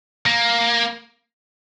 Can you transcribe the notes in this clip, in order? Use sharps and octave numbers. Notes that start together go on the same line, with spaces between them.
A#3